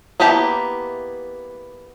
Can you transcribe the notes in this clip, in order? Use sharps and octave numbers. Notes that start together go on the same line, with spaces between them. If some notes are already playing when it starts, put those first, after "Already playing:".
A#3 B3 E4 G4 A5